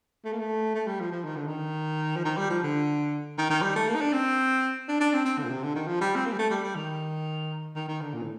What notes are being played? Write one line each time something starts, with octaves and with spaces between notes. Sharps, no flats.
A3
A#3
A3
A3
G3
F3
F3
D#3
D3
D#3
F3
D#3
G3
F3
D3
D#3
D#3
G3
A3
A#3
D#4
D4
C4
D4
D4
C4
C4
D3
A#2
C3
D3
D#3
F3
G3
C4
A#3
G3
A3
G3
G3
D#3
D#3
D#3
D3
A#2
A2